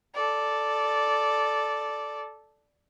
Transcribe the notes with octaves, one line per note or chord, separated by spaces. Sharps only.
A4 D5